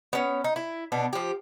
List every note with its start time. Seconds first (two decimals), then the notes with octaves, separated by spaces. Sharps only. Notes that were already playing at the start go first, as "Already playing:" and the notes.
0.13 B3 C#4
0.44 D#4
0.56 E4
0.92 B2 B3 D4
1.13 F3 G4